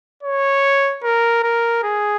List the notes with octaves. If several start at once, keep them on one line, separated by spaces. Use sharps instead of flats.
C#5
A#4
A#4
G#4